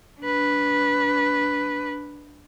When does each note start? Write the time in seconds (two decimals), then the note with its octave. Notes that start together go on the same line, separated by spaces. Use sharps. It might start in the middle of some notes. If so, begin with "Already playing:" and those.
0.21 D4 B4